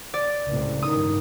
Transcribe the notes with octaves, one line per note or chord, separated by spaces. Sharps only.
D5
C#2 A2 C3
G2 D#3 D#6